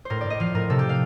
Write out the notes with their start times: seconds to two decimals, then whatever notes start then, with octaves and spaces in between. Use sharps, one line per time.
0.05 A2 A#4 C5
0.21 D5
0.26 A2 D#5
0.40 F3 F5
0.55 A2 A#4
0.70 C3 A4
0.79 G4
0.89 F5